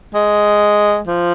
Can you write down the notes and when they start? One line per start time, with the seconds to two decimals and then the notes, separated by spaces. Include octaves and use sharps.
0.14 G#3
1.08 F3